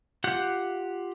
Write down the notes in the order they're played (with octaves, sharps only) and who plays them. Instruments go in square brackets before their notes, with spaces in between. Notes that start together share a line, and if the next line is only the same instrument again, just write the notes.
[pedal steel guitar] F4 G4 F#5 F#6 G6